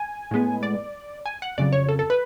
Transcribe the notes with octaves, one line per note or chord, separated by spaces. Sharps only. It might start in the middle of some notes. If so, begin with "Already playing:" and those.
Already playing: G#5
A2 G#3 B3
D5
G#5
F#5
F2 C#3 F#3 D5
C#5
A4
A4
B4